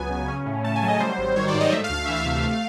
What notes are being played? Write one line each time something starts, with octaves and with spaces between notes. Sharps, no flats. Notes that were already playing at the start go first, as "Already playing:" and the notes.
Already playing: C#2 F#3 B3 G#5
C#3
C#4
A2
A3 A5
G#5
F#3
D#5
G3 C5
G#1
D#3 C#5
D5
G#2
D#5
A3 E5
F5
D2
F5
E3 E5
F5
C3
A3